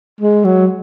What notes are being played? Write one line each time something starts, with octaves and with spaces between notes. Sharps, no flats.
G#3
F#3